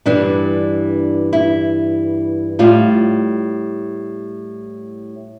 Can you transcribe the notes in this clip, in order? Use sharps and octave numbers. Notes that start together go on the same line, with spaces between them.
G2 E3 G3 D4
E4
A2 G3 F4